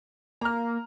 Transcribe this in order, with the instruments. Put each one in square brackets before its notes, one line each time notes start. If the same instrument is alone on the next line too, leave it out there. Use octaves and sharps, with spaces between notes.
[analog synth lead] A#3 [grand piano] A#5 F6